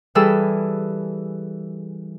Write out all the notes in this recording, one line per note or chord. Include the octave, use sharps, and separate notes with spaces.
E3 G3 G#4 A4 E6